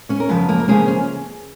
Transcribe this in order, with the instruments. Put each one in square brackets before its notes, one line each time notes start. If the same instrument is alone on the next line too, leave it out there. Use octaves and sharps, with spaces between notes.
[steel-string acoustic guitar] C#4 C#5
A#4
F#2 C#3 F3 B3 B4
A#3 A#4
A#4
C#3 F3 G#3 A#3 C#4 G#4
C#4